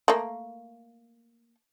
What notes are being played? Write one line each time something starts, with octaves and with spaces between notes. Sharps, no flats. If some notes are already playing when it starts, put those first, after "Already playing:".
A3 A#3